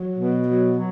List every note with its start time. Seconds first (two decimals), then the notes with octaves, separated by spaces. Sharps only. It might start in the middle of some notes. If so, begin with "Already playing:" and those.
Already playing: F#3
0.18 B2
0.46 F#3
0.74 F#3